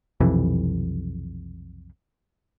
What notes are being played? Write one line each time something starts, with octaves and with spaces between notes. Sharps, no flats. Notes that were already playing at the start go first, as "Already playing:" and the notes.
B1 F2 C3 E3